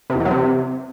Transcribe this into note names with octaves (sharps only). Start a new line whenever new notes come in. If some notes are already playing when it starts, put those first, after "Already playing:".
C3
E2
E3
F#3
C3